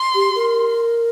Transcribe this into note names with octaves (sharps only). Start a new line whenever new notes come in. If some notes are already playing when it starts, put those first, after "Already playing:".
Already playing: C6
G4
A#4